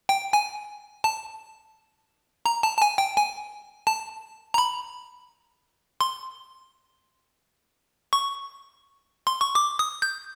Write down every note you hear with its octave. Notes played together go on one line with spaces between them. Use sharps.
G5
G#5
A5
A#5
A5
A5
G#5
G5
G#5
A5
A#5
B5
C6
C#6
C6
C#6
D6
D#6
G6